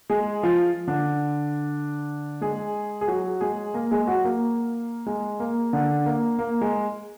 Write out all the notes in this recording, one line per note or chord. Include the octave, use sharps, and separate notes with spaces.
G#3 G#4
F3 F4
D3 D4
G#3 G#4
G#4
F#3 F#4
G#3 G#4
A#3 A#4
G#3 G#4
F#3 F#4
A#3
G#3
A#3
D3 D4
A#3
A#3
G#3